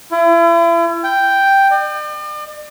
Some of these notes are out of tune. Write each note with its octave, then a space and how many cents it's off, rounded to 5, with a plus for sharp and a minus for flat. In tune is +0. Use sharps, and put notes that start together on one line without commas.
E4 +40
G5 +0
D5 +45